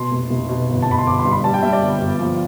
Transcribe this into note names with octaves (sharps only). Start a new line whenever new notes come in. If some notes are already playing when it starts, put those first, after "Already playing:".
Already playing: B2 C6
F1
F1
B2
G1
A5
G1 B5
C6
G1 D6
C6
G2
B5
G3 A5
G5
G3 E5
D5
G1
G1
F3